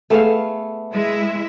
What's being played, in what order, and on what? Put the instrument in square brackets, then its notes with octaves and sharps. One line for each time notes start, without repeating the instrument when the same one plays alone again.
[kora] A3 B3 F5 [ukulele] G#4 A4 B4
[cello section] G#3 E4 E5